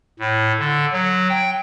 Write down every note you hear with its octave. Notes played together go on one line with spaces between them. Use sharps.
A2
D3
F#3
G5